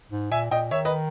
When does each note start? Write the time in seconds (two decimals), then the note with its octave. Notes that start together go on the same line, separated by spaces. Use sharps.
0.11 G#2
0.31 A#2 E5 G#5
0.51 A#2 D#5 G5
0.71 D#3 C#5 E5
0.85 B4 D#5